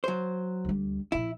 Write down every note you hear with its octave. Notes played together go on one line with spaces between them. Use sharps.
F#3 C5
D2 G3
A#2 F3 E4